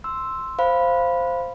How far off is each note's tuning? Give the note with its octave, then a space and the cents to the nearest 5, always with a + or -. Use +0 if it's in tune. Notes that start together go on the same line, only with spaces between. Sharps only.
C6 +0 E6 +0
C5 +0 F5 -10 B5 +0